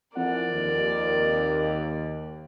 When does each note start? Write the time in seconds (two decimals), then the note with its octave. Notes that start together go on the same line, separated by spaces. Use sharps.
0.16 F2 E3 A#4 D5 F#5
0.50 D#2